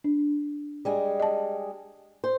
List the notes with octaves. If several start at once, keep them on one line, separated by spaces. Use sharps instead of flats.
D4
G3 G#3 G#4
D#5 A5
C5